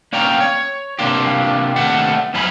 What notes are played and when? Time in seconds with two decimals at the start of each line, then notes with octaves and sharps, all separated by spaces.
0.13 A#3 C#4 D5 F5 G5 A#5
0.40 C#5
0.99 C3 A#3 D4 F4 G4
1.76 D#2 C3 D#3 A3 D4 F#5
2.34 F#2 F3 C#4 D#4 F4 B5